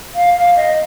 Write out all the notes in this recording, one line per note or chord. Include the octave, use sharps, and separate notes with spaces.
F5
F5
D#5